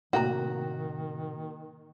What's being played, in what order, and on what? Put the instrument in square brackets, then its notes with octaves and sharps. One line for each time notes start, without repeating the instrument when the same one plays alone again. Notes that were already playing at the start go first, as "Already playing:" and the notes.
[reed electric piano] A2 C3 A#3 [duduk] D#3 [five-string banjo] F#4 [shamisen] F#5 G5 A#5